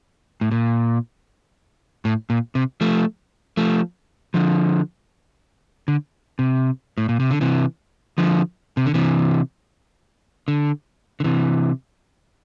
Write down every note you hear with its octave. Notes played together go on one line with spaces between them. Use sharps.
A2
A#2
A2
A#2
C3
F3 A3
F3 A3
D3 F3
D3
C3
A2
A#2
C3
D3
C3 E3
D3 F3
C3
D3
C3 E3
D3
D3
C3 E3